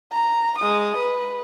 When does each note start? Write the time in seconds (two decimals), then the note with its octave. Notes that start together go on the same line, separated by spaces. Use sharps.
0.12 A#5
0.59 G#3 D#6
0.97 B4